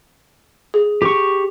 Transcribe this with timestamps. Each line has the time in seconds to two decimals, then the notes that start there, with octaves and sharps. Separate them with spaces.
0.74 G#4
1.02 G4 C#6